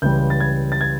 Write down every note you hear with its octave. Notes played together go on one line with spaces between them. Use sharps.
C#2 C#3 E3 G3 G6
A6
G#6
A6
G#6